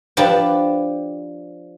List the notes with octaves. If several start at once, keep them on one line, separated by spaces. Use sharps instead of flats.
F3 D4 G4 B4